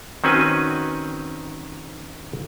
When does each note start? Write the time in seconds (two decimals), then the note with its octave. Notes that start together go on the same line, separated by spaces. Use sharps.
0.24 D#3 C4 C#4 F#4 B4 G#5